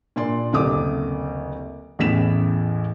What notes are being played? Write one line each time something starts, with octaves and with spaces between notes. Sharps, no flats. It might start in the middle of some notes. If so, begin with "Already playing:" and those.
A#2 D4 D5 C6
F#1 D2 C3 A3 D6 D#6
A1 E2 A2 E4 B6 E7